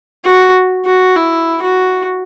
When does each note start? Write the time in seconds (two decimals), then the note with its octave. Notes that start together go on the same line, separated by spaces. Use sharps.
0.24 F#4
0.85 F#4
1.16 E4
1.62 F#4